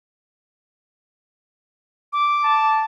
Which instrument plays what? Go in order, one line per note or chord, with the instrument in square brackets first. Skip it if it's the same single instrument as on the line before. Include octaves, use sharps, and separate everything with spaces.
[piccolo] D6
[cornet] A5